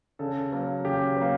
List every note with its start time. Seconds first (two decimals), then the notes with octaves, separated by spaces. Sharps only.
0.19 C#3 A4
0.52 F#3 A#3
0.85 C#3 G4
1.16 F#3 A#3